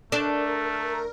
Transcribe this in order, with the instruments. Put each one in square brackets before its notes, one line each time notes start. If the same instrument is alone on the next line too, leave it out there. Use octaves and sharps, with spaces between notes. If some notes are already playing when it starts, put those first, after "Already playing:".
[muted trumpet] A3 [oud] D4 [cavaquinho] A4 [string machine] A#4